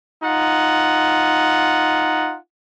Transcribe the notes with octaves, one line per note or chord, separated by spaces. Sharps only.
D#4 F4 F#5